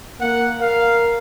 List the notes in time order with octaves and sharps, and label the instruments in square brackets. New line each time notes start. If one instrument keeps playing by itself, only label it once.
[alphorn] A#3 [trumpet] F#5
[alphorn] A#4 [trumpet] F5